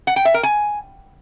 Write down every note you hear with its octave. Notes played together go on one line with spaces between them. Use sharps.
F#5
G5
E5
A#4
G#5